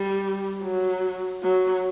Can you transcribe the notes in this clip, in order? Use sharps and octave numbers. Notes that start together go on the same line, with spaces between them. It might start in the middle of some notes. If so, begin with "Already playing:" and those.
Already playing: G3
F#3
F#3